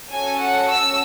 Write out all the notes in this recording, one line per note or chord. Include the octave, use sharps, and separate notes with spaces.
C#4 F#4 A4 G#5
F#5
E6